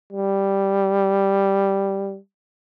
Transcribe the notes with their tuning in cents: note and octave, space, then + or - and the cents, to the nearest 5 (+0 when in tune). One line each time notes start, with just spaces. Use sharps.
G3 +0